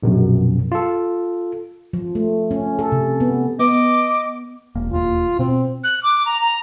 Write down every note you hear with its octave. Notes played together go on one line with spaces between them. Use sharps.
A#1 F#2 B2
F4 A4
F3
A3
C#4
A4
C3
B3
B3 D#5 D6
E1 A#3
E1 D#2 A#3 F4
B2 C4
F#6
D6
A#5
A#5